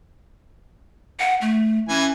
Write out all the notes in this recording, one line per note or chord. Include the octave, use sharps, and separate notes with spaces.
F#5
A3
E3 C#4 G#5